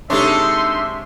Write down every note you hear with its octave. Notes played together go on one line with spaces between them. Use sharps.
C3 G#3 D4 D#4 A4 C#5 E5 C6